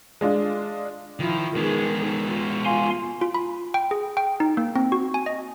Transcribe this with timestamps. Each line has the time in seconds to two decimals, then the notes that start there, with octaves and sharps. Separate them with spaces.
0.21 G#3 D4 F4
1.20 D#3 F3 E4
1.56 D#3 G#3 B3 G#4
2.25 F4
2.65 F5 G#5 C6
3.21 F4
3.34 B5
3.74 G5
3.91 G#4
4.17 G5
4.40 D#4
4.57 A#3
4.75 C4
4.92 F#4
5.14 G#5
5.26 D#5